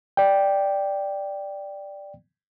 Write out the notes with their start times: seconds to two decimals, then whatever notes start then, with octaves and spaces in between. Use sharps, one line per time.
0.17 D5 G5